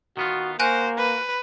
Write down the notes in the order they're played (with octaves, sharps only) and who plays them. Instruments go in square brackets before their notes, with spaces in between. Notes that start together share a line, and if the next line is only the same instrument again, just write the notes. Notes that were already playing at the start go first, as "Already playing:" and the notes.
[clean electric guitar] D#3 B3 F4 [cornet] F#4
[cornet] A#3 [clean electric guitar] F#4 A#4 [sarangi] C5 [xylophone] G#5 F#6
[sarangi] B4